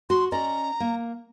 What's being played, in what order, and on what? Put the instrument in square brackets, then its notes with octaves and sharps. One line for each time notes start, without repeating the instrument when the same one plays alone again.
[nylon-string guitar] F#4 [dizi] C6
[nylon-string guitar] C#4 D5 D#5 [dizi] A#5
[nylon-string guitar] A#3